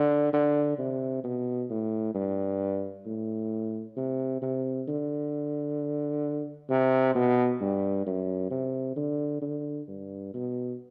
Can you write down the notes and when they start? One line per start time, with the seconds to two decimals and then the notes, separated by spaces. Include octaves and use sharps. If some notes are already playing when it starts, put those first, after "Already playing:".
Already playing: D3
0.33 D3
0.78 C3
1.24 B2
1.70 A2
2.14 G2
3.06 A2
3.97 C3
4.42 C3
4.88 D3
6.70 C3
7.15 B2
7.61 G2
8.07 F#2
8.51 C3
8.96 D3
9.42 D3
9.88 G2
10.34 B2